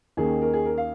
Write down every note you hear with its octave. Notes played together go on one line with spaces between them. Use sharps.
D#2 D#3 A#3 C#4 G#4
A#4
G#4
A#4
F5